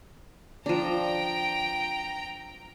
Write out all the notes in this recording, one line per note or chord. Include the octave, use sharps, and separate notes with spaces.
F3 D4 G5 A#5